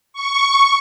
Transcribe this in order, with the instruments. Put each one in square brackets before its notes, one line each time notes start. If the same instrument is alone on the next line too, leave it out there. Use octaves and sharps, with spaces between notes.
[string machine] C#6